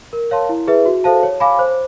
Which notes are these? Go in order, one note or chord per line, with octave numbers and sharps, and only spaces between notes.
A#4
C#5 F5 A5 C6
E4
G#4 B4 E5
F#4
A4 C5 F5 A5
C#5
F5 G#5 B5 D6
C5